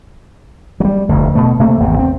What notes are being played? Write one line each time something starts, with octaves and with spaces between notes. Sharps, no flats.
F#3 G3
F1 D2
B2 A3
C3 A3 A#3
G#1 E2 C3
C4